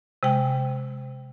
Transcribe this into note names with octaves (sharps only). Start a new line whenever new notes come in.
C3 G#3 G5